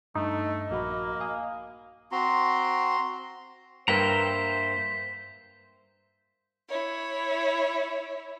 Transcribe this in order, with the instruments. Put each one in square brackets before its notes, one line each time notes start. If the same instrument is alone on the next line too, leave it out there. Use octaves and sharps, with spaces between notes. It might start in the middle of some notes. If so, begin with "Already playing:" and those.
[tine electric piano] G2 [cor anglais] A3 [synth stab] D#4
[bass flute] D#5
[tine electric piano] A#1 F#4 B5 [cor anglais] A#3
[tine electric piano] F5 G#5 D#6
[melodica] C4 F#4 [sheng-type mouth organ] A#5 C6
[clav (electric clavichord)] G2 A#3 B4 [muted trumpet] C5 [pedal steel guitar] E5 G5 A#5 [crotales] B6
[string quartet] E4 C#5